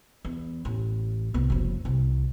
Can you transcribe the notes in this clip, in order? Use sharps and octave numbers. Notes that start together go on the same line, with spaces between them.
E2
A1
C2 B3
F#1 F3
C2